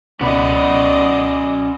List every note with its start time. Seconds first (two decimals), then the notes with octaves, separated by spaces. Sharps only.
0.21 C#2 B2 C#4 B4 D5 D#5 F#5 B5